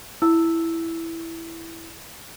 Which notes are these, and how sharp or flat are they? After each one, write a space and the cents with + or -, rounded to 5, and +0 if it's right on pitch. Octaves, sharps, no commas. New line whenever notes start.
E4 +0 E6 +0